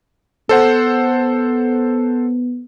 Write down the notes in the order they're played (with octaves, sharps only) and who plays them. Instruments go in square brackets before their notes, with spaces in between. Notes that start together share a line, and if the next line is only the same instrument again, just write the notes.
[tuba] B3 [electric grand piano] A4 C5 F#5